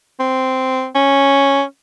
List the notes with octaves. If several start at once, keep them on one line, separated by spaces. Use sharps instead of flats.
C4
C#4